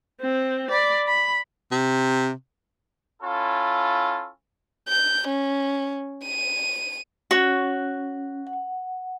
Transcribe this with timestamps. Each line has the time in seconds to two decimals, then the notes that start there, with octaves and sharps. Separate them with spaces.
0.21 C4
0.71 D5 B5
1.07 B5
1.72 C3
3.22 C#4 E4 F4 A4
4.88 G6
5.28 C#4
6.25 D#7
7.31 C#4 F#4 C#5
8.47 F#5